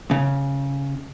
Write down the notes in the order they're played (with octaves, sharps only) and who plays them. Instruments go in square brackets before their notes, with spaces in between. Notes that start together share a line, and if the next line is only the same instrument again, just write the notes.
[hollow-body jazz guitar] C#3